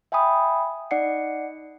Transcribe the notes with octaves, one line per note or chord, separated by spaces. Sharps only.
E5 G5 G#5 B5 D#6
D#4 D5 F#5 C7 C#7